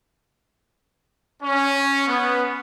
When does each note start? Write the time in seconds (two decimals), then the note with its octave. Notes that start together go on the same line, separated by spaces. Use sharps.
1.42 C#4
2.07 B3